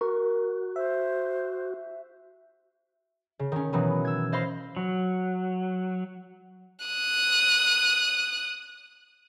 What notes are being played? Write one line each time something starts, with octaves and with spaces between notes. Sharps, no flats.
F#4 A#4
C5 E5
C#3
D#3 C#4
B2 D#3 E3 F#3 B3
E6 G#6
C5 D#5 F5 B5 C6
F#3
D#6 F#6